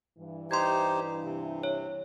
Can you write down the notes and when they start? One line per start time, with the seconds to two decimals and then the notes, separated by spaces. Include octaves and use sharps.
0.18 G2 E3
0.51 D#4 G4 C5 C6 G#6
1.24 C3
1.63 C#5